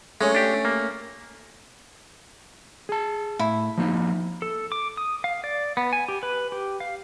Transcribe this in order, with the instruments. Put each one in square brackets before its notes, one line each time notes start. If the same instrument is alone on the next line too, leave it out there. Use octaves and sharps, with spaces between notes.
[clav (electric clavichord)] G#3 [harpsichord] A3 C#4
[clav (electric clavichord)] D4 G4
A#3
[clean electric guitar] G#4 A5
[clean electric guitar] A2 [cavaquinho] E4
[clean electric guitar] F3 A#3 D#4
[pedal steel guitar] A4
D6
D#6
F5
D5
B3
G#5
G4
B4
G4
F5